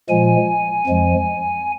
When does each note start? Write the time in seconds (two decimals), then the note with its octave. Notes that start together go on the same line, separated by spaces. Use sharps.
0.09 A#2 F3 G#3 G#5
0.87 F2 F3 G#3